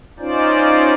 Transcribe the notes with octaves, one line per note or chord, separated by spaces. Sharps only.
C#4 D#4 F4 C5 D5